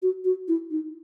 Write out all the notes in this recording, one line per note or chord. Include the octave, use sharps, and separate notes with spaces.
F#4
F#4
E4
D#4